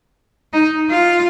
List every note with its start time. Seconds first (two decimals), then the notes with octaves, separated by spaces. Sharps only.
0.53 D#4
0.90 F4